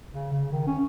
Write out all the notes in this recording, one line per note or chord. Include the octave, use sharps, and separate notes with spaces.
C#3
C#3
D#3
C#4